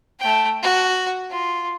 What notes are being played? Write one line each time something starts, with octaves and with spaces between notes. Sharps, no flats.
A3 G5
F#4
F4